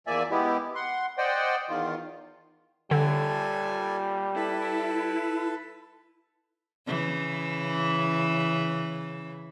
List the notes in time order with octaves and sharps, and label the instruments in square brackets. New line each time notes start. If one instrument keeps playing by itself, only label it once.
[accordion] E2 F3 A#3 D5 E5 G#5
G#3 B3 E4 G4
F#5 C6
C5 D5 D#5 F#5 G5
E2 D#3 F4
[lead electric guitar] A#2 G5 [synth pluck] D3 [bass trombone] G3 [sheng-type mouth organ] A4 G#5
[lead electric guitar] E4 [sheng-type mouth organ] A4 B4
[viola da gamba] C#3 E3